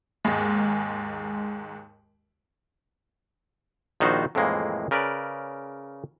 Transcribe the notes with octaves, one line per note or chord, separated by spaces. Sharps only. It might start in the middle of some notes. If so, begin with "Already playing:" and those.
D#2 G#2 G#3
A#1 D#3 G3 D#4 F#4 C5
F2 A2 D#3 E3 G#3 A#3
C#3 A#4 B4 D5